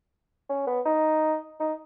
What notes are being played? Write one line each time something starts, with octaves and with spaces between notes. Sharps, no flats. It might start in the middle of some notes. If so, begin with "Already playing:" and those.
C#4
B3
D#4
D#4